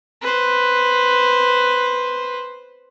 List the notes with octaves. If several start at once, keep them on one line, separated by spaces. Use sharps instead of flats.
B4 C5